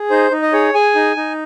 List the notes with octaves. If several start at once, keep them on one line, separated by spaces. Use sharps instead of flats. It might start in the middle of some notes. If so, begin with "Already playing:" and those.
Already playing: G#4
D#4 C5
D#4
D#5
G#4 C#5
G#4 G#5
D#4
D#4